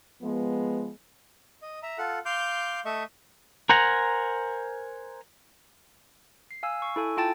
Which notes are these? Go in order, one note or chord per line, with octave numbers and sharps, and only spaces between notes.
F3 G#3 B3
D#5
E5 A#5
F4 A4 F#5
F5 C6 D6 G6
A3 D#5 E5 C#6
A#4 C5 F#5 G#5 A#5
C7
F5 G#5 E6
C#6
E4 A4 G#5
F4 G5 A5 A6